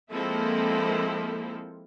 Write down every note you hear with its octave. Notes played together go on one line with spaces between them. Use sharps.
F3 G#3 A#3 C4 E4 A4